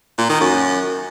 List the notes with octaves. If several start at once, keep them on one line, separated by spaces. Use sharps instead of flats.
A#2
D#3
F#2